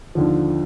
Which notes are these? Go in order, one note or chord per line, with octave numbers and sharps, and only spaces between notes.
D#2 D3 F3